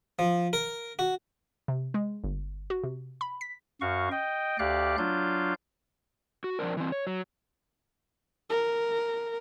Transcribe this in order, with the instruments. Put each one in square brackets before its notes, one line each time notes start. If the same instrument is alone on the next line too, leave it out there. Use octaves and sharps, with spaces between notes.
[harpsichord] F3
A#4
F#4
[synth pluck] C3
G#3
G1
F#4
C3
B5
B6
[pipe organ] F#2 F#4 F5 C#6
D#5 G5
D2 G4 D5 F5 F#6
F#3 D4 F4 F5 G6
[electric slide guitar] F#4
F2 C#3 C4 D4 A#4
E3 C4
C#5
F#3
[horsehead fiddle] A#4